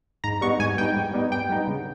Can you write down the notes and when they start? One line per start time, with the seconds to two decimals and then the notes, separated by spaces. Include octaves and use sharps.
0.24 G#2 A#5
0.41 G3 B3 D#4 C#6
0.60 G#2 G#5
0.77 G3 B3 D#4 G5
0.96 G#2
1.13 G3 B3 D#4
1.32 G#2 G5
1.49 G3 B3 D#4
1.68 C#3